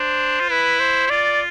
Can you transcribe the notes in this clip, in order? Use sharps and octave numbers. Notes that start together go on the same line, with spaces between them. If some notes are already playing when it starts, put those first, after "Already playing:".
Already playing: D4 C5
F4
E4 B4
C5
E4
F4 D5